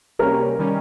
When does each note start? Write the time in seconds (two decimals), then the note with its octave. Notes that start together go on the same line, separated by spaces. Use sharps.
0.19 C3 G3 A#3 C#4 A#4
0.59 D#3 G3 C#4